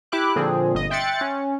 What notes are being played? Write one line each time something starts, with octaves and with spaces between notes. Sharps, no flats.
E4 G4 E5 D6 F#6
A#2 D3 F3 C4 G#4
G1 D#5
E5 G5 C6 F#6 A6 C#7
C#4